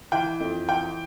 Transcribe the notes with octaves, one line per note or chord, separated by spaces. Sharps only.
E3 G5
F2
E3 G5